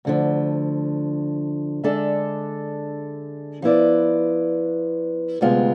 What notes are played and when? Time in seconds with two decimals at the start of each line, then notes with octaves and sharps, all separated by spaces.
0.05 D2 D3 F3
1.84 D3 G#3 D4 A4 E5
3.62 F3 B3 E4 B4 D5
5.41 D2 C3 G#3 B3 F4